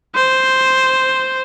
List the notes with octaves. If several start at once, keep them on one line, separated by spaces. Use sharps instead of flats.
C5